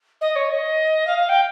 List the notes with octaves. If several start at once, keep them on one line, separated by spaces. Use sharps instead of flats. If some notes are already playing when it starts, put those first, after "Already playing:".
D#5
C#5
D#5
F5
F5
G5